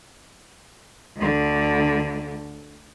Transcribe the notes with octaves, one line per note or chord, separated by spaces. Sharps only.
D2 D3